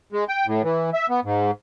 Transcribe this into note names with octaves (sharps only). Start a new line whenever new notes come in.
G#3
G5
A2
E3
E5
B3
G#2